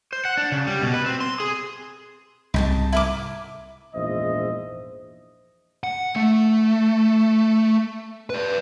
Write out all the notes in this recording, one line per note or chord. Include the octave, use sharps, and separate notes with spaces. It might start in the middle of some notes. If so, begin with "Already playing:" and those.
C5
F#5
D4
C#3
G3
B2
B4
C4
C6
G#4
C2 G#2 D#4 G5 A5
E4 A#4 D6
A#1 E2 G#2 C5 D#5 E5
F#5
A3
B4 D5